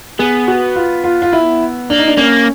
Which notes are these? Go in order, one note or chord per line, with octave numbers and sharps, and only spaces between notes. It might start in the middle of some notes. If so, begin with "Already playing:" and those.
B3 G#4
F#4
F4
F4
F4
E4
A#3 D4
D#4
D4
A#3 C#4